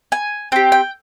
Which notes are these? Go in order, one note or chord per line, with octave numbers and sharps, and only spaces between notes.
G#5
C4 G4 G5
G5